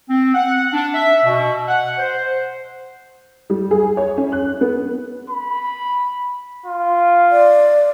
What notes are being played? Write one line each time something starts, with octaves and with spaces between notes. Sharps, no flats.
C4
F#5
D4
E5
B2
F#5
C5
G3
G#4
C#5
C#4
F#6
B3
B5
F4
D5